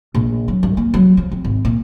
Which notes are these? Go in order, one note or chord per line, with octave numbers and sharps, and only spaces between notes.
A#1
F#3
G2
A#3
F#3
F3
C4
G#1
A#2